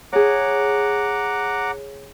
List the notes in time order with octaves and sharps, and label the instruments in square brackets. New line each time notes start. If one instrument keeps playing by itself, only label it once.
[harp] G#4 C#5 [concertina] F#5 A#5 D6